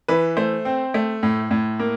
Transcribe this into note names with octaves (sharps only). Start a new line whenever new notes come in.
E3 B4
A3 C5
C4
A3
A2
A2
A#3